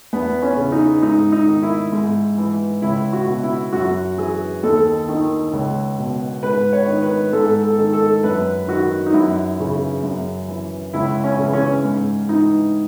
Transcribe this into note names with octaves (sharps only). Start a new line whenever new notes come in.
E2 B3
C#4
C#3 E3
D#4
G#2 D#4
D#4
D#3
E4
G#2
E3
C#2 E4
F#4
B2
E4
F#2 F#4
E3 G#4
D#2 A4
D#3
C#2
B2
G#2 B4
C#5
D#3
B4
G#2 A4
A4
D#3
A4
F#2 B4
D#3 F#4
D#4
F#2 E4
C#3 E3
F#2
E3
C#2 E4
C#4
C#3
E3
C#4
G#2
E3 D#4